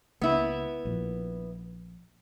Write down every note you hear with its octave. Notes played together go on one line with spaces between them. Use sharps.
C#2 A#3 B3 E4
A#1 A#2